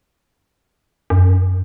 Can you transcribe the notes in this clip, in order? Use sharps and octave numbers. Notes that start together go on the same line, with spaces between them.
F#2